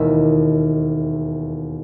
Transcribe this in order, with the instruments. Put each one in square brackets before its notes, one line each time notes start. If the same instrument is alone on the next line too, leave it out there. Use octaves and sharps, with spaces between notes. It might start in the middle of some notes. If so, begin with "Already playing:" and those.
Already playing: [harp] E1 D#2 D#3 E5